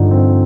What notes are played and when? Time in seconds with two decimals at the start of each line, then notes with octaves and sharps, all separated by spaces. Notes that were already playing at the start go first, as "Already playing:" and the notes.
Already playing: G2 D3 F3 D#4
0.11 C4